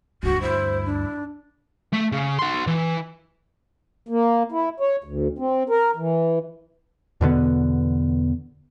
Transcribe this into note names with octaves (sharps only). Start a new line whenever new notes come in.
D2 G2 F#4
E4 C5
D4
A3
C#3
F#4 C6
E3
A#3
E4
C#5
D2
C4
A#4
E3
E2 B2 D3 B3